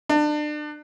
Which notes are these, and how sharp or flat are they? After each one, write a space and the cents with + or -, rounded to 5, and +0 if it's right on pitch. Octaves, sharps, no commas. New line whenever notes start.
D4 +30